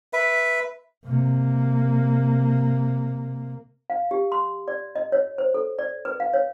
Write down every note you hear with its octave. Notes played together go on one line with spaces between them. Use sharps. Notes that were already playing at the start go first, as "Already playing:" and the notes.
B4 E5
C3 A#3
F5
G4
C6
D5
D#5
C#5
C5
A4
D5
B4
F5
C#5